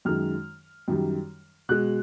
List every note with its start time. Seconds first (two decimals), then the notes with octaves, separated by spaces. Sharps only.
0.05 F#2 D#3 G#3 F6
0.88 F#2 D#3 G3
1.69 B2 G#3 F#6